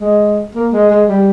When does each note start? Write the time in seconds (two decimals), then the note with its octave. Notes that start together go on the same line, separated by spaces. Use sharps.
0.01 G#3
0.55 A#3
0.73 G#3
0.90 G#3
1.08 G3